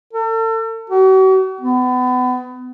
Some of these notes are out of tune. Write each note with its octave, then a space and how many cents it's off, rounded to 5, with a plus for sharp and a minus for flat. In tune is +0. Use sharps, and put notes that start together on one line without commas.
A4 +35
F#4 +45
B3 +30